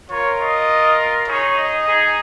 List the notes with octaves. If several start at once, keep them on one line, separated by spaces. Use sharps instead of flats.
F4 A#4 C#5
D#5
D#4 G#4 C#5
D#5
D#4 G#4